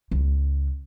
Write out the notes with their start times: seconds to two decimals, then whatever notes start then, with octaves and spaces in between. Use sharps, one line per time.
0.11 C#2